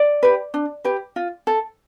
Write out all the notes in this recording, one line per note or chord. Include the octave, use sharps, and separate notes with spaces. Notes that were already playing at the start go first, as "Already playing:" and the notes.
Already playing: D5
G4 B4
D4
G4 B4
F4
A4